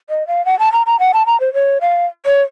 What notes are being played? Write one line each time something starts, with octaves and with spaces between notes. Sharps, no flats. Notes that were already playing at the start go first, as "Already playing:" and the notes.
D#5
F5
F#5
A5
A#5
A#5
F#5
A5
A#5
C5
C#5
F5
C#5